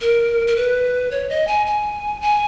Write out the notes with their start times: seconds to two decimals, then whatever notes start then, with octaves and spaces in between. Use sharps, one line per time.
0.01 A#4
0.47 A#4
0.56 B4
1.11 C#5
1.29 D#5
1.47 G#5
1.66 G#5
2.21 G#5